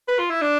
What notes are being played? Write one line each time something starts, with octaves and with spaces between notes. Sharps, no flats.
B4
F4
E4
D4